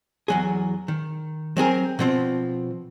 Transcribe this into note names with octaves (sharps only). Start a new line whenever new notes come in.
E2 F#3 G#4
D#3
F#3 C4 G#4 A#4
B2 F3 C4